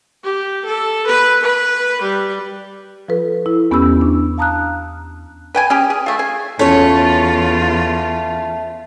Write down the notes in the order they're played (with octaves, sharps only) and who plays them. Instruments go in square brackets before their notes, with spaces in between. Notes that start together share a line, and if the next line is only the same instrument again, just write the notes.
[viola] G4
A4
B4
B4
G3
[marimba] F3 F4 A4 B4
E4
E2 B3 C#4 G4 B5 E6
D4
F5 A5 A#5 D#6 F6 F#6
[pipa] B4 G5 G#5
C#4 G4 G#4
G#4
A3 F4
G#4 G#5
[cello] E2 F4 [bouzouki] A3 C#5 [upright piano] C#4